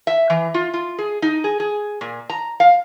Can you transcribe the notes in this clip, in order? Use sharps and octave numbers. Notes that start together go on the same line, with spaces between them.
E5
E3
F4
F4
G#4
D#4
G#4
G#4
A#2
A#5
F5